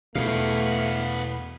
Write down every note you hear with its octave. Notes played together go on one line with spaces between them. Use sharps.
E2 B2 A3 B3 F5